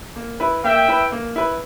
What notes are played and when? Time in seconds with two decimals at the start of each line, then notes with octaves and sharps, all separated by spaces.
0.16 A#3
0.40 E4 B4
0.64 A#3 E5 G5
0.88 E4 B4
1.12 A#3
1.36 E4 B4